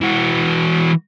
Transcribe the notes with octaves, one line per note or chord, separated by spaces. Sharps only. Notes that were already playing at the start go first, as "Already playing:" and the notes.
E3 F#4